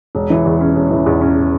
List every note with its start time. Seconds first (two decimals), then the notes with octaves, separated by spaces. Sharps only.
0.15 E1
0.30 E3
0.45 E2
0.60 C#4
0.76 E1
0.90 E3
1.06 E2
1.21 C#4